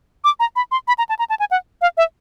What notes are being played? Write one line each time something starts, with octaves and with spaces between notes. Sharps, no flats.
D6
A#5
B5
C6
B5
A#5
A5
A#5
A5
G#5
F#5
F5
E5